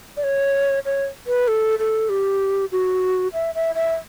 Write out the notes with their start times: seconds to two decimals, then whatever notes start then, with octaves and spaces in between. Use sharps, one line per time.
0.17 D5
0.24 C#5
0.85 C#5
1.27 B4
1.48 A4
1.79 A4
2.09 G4
2.72 F#4
3.33 E5
3.55 E5
3.75 E5